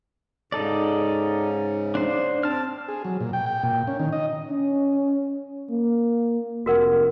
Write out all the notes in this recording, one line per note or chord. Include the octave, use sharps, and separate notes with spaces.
G#2 C#3 D#4 A4 D5
D4 C5
C4 A5 F6
G#4
F#3
A#2
G5
G5
A#2
C#4
D#3
D#5
C#4
A#3
F1 F#4 A#4 F#5